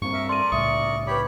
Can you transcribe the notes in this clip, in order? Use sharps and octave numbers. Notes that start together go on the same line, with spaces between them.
G2 A#3 C4 C#6
A#4 E5
A4 A#4 D5 C6 D#7
C2 A2 C#3 E5 C#6 D#6
G4 B4 C#5 B5 D6